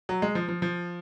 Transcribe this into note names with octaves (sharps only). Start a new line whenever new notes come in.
F#3
G#3
F3
F3
F3